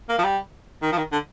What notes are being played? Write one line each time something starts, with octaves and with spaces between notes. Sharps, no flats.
A#3
F3
G3
D#3
F3
D#3
D3